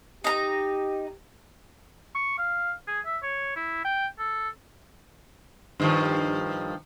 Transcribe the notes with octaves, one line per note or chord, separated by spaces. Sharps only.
D#4 G4 A#5
C#6
F5
G#4
E5
C#5
E4
G5
A4
G2 D#3 F3